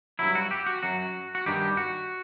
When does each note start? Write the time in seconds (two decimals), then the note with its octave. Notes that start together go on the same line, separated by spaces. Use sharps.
0.19 G2 F#3 E4
0.35 F#4
0.51 G4
0.66 F#4
0.83 F#2 F#3 F#4
1.35 F#4
1.46 G2 D#3 G3 G4
1.77 F#4